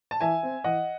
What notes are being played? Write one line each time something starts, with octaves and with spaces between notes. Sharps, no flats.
A5
E3 E5 G#5
C4
E3 D#5 F#5